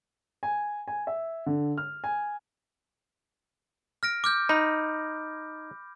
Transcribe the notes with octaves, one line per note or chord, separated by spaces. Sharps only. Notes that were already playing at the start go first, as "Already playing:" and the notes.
G#5
G#5
E5
D3
F6
G#5
F6 A#6 D7
D6 F6 G6
D#4 B5